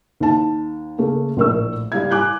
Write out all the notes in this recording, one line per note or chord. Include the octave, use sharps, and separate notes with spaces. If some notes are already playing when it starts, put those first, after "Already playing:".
D#2 A5
C#3 A3 A#3
A#1 A2 A#4 C#6 E6
G3 F5 G#6
G#5 D6 F#6 G6